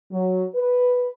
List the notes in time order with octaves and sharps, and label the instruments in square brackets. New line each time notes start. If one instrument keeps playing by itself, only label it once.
[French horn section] F#3
B4